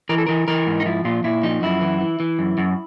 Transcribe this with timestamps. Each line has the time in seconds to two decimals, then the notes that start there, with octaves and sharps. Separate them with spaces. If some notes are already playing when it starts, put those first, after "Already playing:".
0.09 E3 A#4
0.18 A4
0.27 E3 A#4
0.48 E3 A#4
0.67 G#2
0.80 D#4
0.86 F3 E4
1.05 A#2 F4
1.24 A#2 E4
1.43 F3 D#4
1.62 F#2 E4
1.81 E3
2.01 E3
2.20 E3
2.39 F#2
2.58 F#2